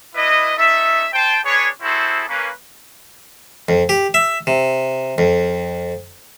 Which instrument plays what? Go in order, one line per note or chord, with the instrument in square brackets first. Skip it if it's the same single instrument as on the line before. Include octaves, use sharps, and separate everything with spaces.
[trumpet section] D4 E4 B4 D#5
C#4 D#4 A4 E5
C5 G5 A5
D4 G#4 B4 C#5
C4 E4 F#4 G#4 A4 C5
A#3 C#4 B4
[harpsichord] F2
G4
E5
C3
F2